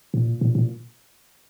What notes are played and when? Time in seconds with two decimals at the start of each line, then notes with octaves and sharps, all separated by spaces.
0.14 A#2
0.41 A#2
0.55 A#2